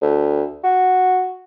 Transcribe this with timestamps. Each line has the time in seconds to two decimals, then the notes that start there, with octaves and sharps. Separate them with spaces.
0.02 D2
0.63 F#4